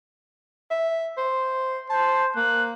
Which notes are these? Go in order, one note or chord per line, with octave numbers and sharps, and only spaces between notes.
E5
C5
C5 A5
A#3 F#6